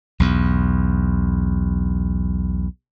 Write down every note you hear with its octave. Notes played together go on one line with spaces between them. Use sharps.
B1 E2